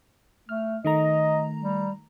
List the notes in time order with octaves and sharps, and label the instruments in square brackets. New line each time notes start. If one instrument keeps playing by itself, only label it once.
[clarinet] A3 [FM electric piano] F6
[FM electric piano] D#3 A3 A#5 [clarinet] D#5
[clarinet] G3